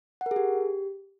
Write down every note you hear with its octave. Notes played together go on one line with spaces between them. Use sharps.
F#5
A#4
G#4
G4